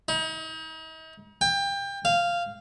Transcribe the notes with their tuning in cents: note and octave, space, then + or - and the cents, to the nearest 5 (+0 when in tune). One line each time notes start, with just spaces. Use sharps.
D#4 +40
G5 +25
F5 -10